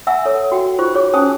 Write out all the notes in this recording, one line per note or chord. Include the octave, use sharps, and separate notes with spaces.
E5 F#5 G#5 A#5 E6
A4 C#5
F#4 G5
D#4 F4 C5 C#6
G#4 C#5 D6
C#4 C5 G#5 A5 D#6